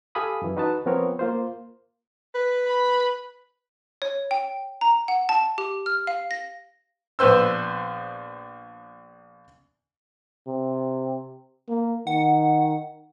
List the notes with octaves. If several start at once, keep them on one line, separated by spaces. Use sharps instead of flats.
G4 A4 F5 G#5 B5 D#6
F#2 E3
D#4 F#4 B4 D#5 F#5 A5
F3 B3 C4 A#4 C#5
A#3 F4 C5
B4
B5
C#5
G5
A#5
F#5
A5
G4
F6
F5
A#6
A#1 B3 B4 C5 E6
C3
A#3
D#3 F#5